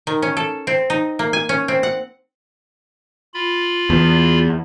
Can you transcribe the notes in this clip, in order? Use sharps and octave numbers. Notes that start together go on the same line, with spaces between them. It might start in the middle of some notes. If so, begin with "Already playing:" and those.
D#3
C#4
A4
C4
D#4
A#3
G#5
C#4
C4
F#5
F4 B5
E2